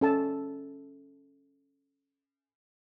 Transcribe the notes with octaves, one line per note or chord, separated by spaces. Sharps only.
C#4 A4 A5